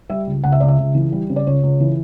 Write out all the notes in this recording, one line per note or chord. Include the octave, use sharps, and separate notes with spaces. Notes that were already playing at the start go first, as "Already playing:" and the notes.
G3 E5
C#2
C#2 F#5
E5
C#2 D5
E5
C#2
E3
G3
C#3
D5
C#2 C#5
C#2
E3